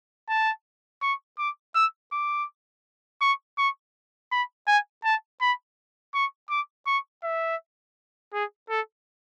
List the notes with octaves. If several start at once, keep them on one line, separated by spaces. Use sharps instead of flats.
A5
C#6
D6
E6
D6
C#6
C#6
B5
G#5
A5
B5
C#6
D6
C#6
E5
G#4
A4